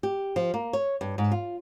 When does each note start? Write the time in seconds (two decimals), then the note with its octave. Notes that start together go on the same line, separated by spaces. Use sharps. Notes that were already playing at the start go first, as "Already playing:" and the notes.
0.03 G4
0.36 F3
0.54 A#3
0.73 C#5
1.01 G2
1.18 G#2
1.32 F4